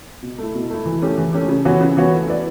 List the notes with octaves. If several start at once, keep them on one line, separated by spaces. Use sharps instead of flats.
B2
A3 E4
B2
A3 E4
E3
A3 C#4 G4
E3
A3 C#4 G4
C#3
E3 B3 F#4 C#5
C#3
E3 B3 F#4 C#5
A3
E4 B4 D5